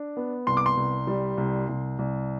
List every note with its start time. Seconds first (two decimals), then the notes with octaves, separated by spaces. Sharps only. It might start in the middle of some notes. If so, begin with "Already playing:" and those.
Already playing: D4
0.17 B3
0.47 C2 C6
0.57 D6
0.66 C6
0.77 C2
1.07 G3
1.38 C2
1.69 C2
1.99 C2